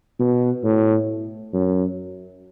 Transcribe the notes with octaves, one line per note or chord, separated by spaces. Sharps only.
B2
A2
F#2